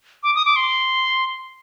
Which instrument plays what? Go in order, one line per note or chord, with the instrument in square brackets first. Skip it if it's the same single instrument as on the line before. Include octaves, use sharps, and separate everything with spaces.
[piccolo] D6
D#6
D6
C6